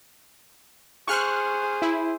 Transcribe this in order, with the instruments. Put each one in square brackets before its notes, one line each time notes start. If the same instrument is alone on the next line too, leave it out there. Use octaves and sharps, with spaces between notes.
[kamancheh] G#4 C5 [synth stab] C#6 F6 F#6
[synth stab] E4